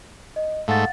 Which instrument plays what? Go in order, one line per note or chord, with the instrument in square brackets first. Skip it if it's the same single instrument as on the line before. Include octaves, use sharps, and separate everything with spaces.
[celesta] D#5
[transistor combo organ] G#2 A3 [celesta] F5 F#5 A6